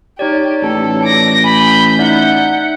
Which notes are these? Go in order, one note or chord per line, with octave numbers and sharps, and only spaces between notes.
D#4 G4 C#5 D5
A1 A4
D6 A#6
G#5 B5 G6
D#4 D5 E5 F#5